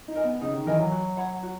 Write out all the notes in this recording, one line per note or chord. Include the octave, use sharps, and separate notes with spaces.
D#4
A#4 D#5 G#5
B3
C#3 D#4
D#3
E3 A#4 D#5 G#5
F#3
F#4
C#5 F#5 B5
F#4